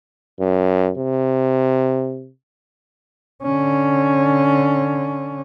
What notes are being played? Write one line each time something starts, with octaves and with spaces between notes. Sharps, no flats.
F#2
C3
D3 C#4